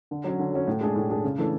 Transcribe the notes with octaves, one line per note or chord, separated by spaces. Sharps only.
D3
F#3 C#4
D3
F#3 C#4
A2
G#3 D4 G#4
A2
G#3 D4 G#4
C#3
E3 A3 D4 A4